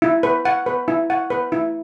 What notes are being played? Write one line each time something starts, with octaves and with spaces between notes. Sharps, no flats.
E4
B4
F#5
B4
E4
F#5
B4
E4